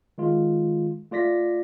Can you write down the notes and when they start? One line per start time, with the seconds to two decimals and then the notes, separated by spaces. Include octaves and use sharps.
0.18 D#3 G#3 F4
1.11 A3 F4 D5 A#6 B6